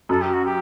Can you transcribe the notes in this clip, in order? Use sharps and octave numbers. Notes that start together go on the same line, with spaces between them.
F#2 A4
G4
F#4
G4